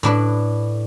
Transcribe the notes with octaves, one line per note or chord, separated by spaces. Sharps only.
A2 D4 B4